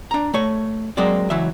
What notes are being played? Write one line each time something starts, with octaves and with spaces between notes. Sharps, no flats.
D4 A#5
A3 C#5
F#3 G#3 A#3 C4 D5
C#2 E3 F#3 E5